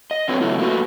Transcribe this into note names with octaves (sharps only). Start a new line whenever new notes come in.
D#5
D3 C4 D4 F#4 B4 C#5
C#3 F#3 A3 E4
A3 A#3 F#4 B4